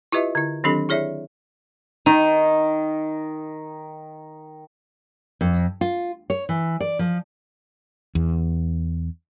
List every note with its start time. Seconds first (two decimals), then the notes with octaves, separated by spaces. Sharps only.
0.12 E4 F4 G4 B4 D#5 E5
0.35 D3 E4
0.64 D#3 F#3 C4 D4 G4 A4
0.89 E4 G#4 C#5 D5 E5
2.06 D#3 D#4
5.41 F2
5.81 F4
6.30 C#5
6.49 E3
6.80 D5
6.99 F3
8.15 E2